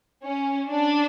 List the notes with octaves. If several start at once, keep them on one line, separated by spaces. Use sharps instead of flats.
C#4
D4